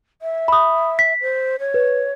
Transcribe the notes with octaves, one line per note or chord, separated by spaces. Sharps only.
E5
B5 D#6
B6
C5
C#5
B4